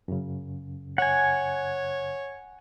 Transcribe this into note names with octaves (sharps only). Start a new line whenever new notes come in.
F#2 C#3
C#5 F#5 G#5